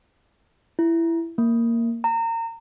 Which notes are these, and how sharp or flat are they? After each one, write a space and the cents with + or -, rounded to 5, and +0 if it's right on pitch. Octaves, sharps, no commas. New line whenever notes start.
E4 +15
A#3 -10
A#5 -30